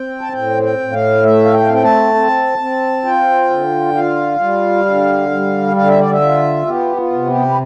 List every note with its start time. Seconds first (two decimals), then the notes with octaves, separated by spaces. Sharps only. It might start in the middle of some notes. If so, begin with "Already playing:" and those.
Already playing: C4 G5
0.21 A5
0.33 A2 G5
0.63 G5
0.78 A2
0.92 F5
1.23 A3 E5
1.45 F5
1.53 G5
1.64 C4 F5
1.73 G5
1.84 A5
2.14 C4
2.58 C4
3.04 F4 G5
3.50 D3
3.95 F4 F5
4.40 G3
4.85 D3
5.31 G3
5.76 D3 F5
5.88 E5
5.99 D5
6.12 E5
6.21 F4
6.66 B3 G4
6.96 F4
7.12 C3
7.27 G4
7.49 B4